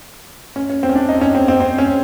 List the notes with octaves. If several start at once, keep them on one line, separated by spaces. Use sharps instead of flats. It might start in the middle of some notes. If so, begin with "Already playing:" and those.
C#4
C#4
C4
C#4
D4
D#4
C#4
C4
C4
C4
C#4